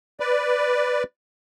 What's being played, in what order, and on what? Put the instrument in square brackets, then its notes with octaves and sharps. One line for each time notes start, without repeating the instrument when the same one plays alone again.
[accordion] B4 D5